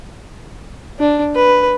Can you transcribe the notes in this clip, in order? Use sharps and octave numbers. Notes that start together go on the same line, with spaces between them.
D4
B4